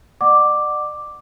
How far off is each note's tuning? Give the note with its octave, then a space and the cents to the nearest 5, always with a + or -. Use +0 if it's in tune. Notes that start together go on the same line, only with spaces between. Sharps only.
D5 +40 F#5 +0 D6 +0